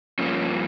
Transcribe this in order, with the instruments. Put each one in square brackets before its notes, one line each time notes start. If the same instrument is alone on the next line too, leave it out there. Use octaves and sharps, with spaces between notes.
[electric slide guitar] G2 F3 A#3 C#4